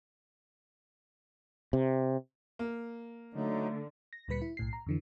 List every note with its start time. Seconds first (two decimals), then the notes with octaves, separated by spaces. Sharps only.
1.73 C3
2.59 A#3
3.34 D3 F#3 A3 D#4
4.13 A#6
4.28 D2 A#2 G3 B4 B6 C#7
4.42 E4
4.57 B1 A2 C7
4.73 A#5
4.86 F2 D3 E3